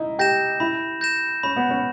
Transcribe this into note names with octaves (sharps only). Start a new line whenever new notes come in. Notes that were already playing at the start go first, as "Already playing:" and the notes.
Already playing: D#4 E4
G4 G6 A#6 E7
E4 B5
G6 A#6 E7
C#4 B5
B3
C#4